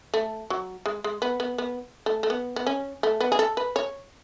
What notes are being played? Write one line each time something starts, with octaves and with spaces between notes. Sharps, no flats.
A3
F#3
G#3
G#3
B3
B3
B3
A3
A3
B3
B3
C#4
A3
B3
G#4
A4
B4
C#5